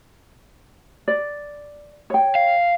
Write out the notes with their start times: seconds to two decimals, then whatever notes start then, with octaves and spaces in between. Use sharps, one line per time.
1.08 D5
2.10 C#5 G5
2.35 F5